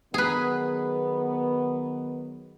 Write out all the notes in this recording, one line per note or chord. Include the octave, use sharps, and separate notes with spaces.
D#3 F#3 B3 G#4 B4